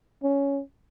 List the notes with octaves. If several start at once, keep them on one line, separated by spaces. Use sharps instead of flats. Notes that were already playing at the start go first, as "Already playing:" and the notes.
C#4